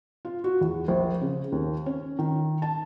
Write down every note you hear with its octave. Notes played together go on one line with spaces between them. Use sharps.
F4
F#4
E2
A#1
C#3
D#2
C#4
D#3
A5